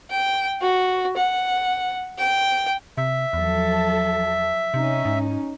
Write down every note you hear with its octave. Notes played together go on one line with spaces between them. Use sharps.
G5
F#4
F#5
G5
C3 E5
E2 F3 F#3 A4
C3 C#4 D#4
G#2